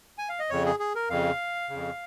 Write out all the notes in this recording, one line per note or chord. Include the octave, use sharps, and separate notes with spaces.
G#5
F5
D#5
F2 C#3 C#5
G#4
G#4
A#4
F2 C#3 F5
F2 C#3